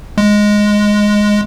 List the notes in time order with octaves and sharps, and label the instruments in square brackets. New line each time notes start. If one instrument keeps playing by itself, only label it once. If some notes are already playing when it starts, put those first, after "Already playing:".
[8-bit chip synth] G#3